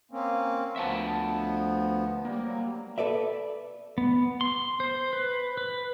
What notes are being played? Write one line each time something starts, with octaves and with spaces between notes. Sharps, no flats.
A#3 C4 C#4
D2 F3 B3 E5 F#5 A5
G3 A#3
F#3 G3
A4 B4 D5 E5
B3
C6
C5
B4
B4